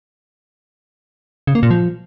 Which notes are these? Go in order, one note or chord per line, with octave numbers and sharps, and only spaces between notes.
C#3
A#3
A#2
F3